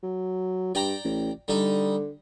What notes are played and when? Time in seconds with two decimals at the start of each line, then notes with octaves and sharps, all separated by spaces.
0.03 F#3
0.75 G2 D5 G5 A#5
1.04 A1
1.48 D3 G3 D#4